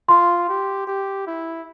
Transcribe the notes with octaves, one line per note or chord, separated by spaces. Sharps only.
F4 C6
G4
G4
E4